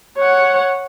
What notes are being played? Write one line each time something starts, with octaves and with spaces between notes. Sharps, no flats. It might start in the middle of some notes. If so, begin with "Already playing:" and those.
C#5 F#5